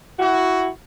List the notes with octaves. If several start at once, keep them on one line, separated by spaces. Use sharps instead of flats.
E4 F#4